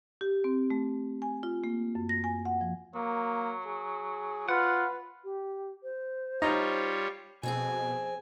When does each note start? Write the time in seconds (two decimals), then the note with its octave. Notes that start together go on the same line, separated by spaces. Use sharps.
0.21 G4
0.44 C4
0.70 A3
1.22 G#5
1.43 F4
1.64 A#3
1.95 F#2
2.09 A#6
2.24 G#5
2.45 F#5
2.61 F3
2.95 F#3 A#3
3.66 G#4
4.49 F4 B4 F#5
5.24 G4
5.83 C5
6.42 G3 D#4 F4 C#5 D#5 A#5
7.43 F2 B2 C4 G#4 G#5